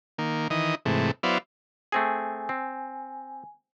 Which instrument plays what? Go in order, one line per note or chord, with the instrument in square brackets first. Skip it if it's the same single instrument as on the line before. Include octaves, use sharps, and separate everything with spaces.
[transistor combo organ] D#3 A#3
D#3 E3 D#5
G#2 C3 E3 A3
F#3 B3 E4 C5 D5 F5
[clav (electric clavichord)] A3 C4 G#4 [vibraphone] G#5
[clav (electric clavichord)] C4